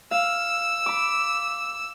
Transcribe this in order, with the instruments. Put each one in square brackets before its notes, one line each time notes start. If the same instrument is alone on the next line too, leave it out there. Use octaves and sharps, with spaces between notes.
[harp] F5 [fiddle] E6
[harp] B5 D6